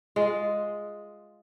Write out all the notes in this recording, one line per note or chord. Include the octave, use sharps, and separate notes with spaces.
G#3 F4